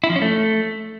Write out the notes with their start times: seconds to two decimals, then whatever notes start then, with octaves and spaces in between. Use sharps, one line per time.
0.04 E4
0.10 F3
0.16 C#4
0.22 A3